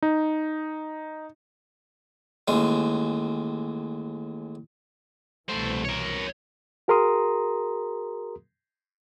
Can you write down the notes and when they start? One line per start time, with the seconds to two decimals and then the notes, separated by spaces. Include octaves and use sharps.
0.02 D#4
2.48 A1 D#2 G#3
5.48 C2 B2 E3 A3 C5
5.85 A#4 C#5
6.88 F#4 G#4 A#4 A#5 C6 D#6